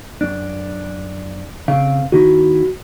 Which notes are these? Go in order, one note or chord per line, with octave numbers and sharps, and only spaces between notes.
F#2 D4
C#3 C4 F5
D#2 D#3 E4 F#4